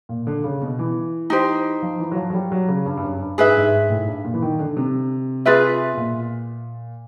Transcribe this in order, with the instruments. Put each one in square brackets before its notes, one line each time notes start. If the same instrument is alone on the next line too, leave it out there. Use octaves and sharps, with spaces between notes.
[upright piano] A#2
D3
C#3
B2
E3
[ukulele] D#4 G4 C5
[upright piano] F3
E3
F#3
F3
F#3
G3
F#3
C#3
G2
G2
F#2
G2
[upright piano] G#2 [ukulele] G#4 B4 E5
[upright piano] G2
G#2
A2
G2
A#2
E3
D#3
D3
C3
[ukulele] F4 G#4 B4 E5
[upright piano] B2
A#2